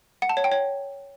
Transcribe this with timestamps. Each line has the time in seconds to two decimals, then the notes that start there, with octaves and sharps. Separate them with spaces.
0.22 F#5
0.29 A5
0.37 C#5
0.44 G5
0.52 C#5